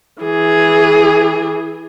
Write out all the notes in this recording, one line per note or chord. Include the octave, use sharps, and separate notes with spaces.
E3 G#4